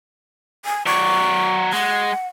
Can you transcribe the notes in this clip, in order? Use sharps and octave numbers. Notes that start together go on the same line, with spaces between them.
G#5
F#3 D5 C#6
G#3 F#5